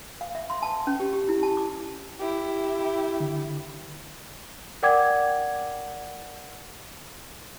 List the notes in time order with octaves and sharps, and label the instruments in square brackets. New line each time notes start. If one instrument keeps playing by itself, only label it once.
[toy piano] F5
E5
C6
A5
C#4
G4
G4
E4
A5
D6
[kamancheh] E4 G4
[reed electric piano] D3
[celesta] A#4 D5 F#5 G5 D6 G#6